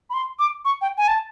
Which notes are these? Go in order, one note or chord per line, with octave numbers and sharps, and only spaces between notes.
B5
C6
D6
C#6
G5
G#5
A5